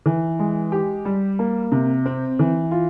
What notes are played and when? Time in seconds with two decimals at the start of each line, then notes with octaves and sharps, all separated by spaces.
0.06 E3
0.39 G#3
0.72 G4
1.05 G3
1.39 A#3
1.72 C3
2.06 C4
2.39 E3
2.71 F4